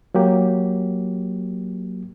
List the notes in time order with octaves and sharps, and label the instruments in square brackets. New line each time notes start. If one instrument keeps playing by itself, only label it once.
[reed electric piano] F#3 A#3 G4